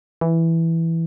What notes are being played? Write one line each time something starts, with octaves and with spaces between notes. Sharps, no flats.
E3